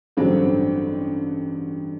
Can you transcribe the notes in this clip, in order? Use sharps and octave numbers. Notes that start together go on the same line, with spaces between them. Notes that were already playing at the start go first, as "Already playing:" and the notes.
A1 G2 D3 F#3 C4